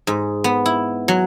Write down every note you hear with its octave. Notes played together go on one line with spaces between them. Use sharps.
G#2
B3
E4
F#3